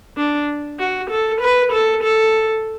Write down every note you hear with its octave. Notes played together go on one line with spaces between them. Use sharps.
D4
F#4
A4
B4
A4
A4